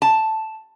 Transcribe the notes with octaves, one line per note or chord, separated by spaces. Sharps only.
A5